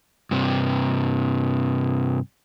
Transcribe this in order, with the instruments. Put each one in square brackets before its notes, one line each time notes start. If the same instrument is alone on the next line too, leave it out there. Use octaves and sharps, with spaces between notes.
[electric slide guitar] G2 C3